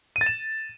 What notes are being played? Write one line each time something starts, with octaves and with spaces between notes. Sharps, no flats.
D#7
A6
E7